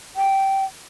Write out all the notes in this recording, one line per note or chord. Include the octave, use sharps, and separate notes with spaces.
G5